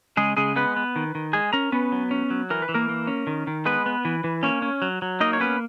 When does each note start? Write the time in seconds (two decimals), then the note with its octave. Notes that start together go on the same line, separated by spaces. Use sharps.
0.17 C#3 G#3 G#4
0.37 C#3 G#3 G#4
0.56 G#3 B3 B4
0.76 B3
0.96 D#3
1.15 D#3
1.33 G#3 G#4 G#5
1.53 C#4 A#4 A#5
1.72 B3 C#4 B4
1.92 F#3
2.11 C#4
2.30 F#3
2.50 E3 A#4
2.62 B4
2.69 E3
2.74 A#3 A#4
2.89 A#3
3.07 C#4
3.27 D#3
3.47 D#3
3.66 G#3 B3 B4
3.86 B3
4.05 E3
4.24 E3
4.43 A#3 C#4 C#5
4.62 C#4
4.82 F#3
5.02 F#3
5.21 A#3 D#4 D#5
5.33 C#5
5.40 B3 C#4 B4